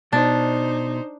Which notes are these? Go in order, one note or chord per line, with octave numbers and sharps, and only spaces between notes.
B2 D4 D#4 C5